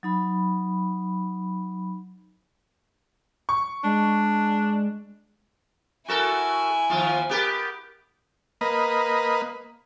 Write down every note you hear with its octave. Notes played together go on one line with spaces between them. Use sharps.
F#3 D#4 B5
C#6
G#3 D4
E4 F#4 A4 A#4 G#5
D#2 F3 F4
B3 G4 A#4
A#3 B4 D#5